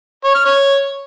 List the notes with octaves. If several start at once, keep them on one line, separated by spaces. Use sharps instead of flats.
C#5
F6
C#5